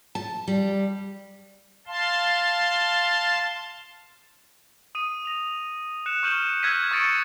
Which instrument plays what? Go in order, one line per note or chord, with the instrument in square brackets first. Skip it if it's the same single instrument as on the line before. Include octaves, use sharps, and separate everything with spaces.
[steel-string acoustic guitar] A5
G3
[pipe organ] F5 A5 C6
[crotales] D#6 D#7
A#6 F7
F#6 C#7 E7
C#6 F6 G6 D#7 E7 F#7
E6 F#6 G#6 A#6 B6 D#7
C#6 D#6 G#6 A6 C#7 D7